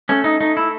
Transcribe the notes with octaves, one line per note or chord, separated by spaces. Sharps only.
A3 C#4
D#4
A3 D#4
E4